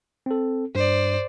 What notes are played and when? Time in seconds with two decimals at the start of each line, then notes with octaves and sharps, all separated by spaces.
0.26 C4 A4
0.75 G2 C5 D5